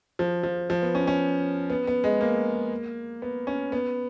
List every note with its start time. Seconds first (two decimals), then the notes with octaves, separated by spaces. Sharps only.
0.19 F3
0.43 F3
0.70 F3
0.82 B3
0.95 C#4
1.07 C#4
1.70 B3
1.87 B3
2.04 G#3
2.21 A#3
3.22 B3
3.47 C#4
3.72 B3